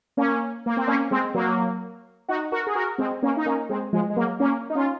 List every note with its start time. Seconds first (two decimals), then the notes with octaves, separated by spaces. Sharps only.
0.17 A#3 C#4
0.66 A#3
0.77 C4
0.87 A#3 C#4
1.11 G#3 C4
1.34 F#3 A#3
2.28 D#4 F#4
2.52 F#4 A#4
2.67 G#4
2.75 F#4 A#4
2.98 G#3 C4
3.22 A#3 C#4
3.37 D#4
3.46 A#3 C#4
3.69 G#3 C4
3.93 F3 G#3
4.10 G#3
4.16 F#3 A#3
4.40 A#3 C#4
4.70 D#4
4.75 C#4 F4